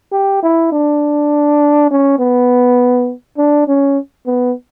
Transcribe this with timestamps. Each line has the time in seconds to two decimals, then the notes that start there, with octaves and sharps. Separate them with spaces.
0.12 G4
0.43 E4
0.72 D4
1.91 C#4
2.19 B3
3.38 D4
3.68 C#4
4.27 B3